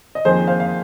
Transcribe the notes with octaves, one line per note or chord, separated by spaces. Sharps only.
D#5
F2 D#3 A#3 G#4 C5
C5 F5
F5